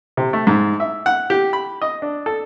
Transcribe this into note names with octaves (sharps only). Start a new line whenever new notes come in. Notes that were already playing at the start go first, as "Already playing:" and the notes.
C3
A3
G#2
E5
F#5
G4
B5
D#5
D4
A4